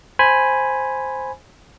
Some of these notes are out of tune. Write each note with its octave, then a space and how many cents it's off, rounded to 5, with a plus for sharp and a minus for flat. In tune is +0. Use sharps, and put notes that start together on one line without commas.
C5 +0 G#5 +0 B5 +0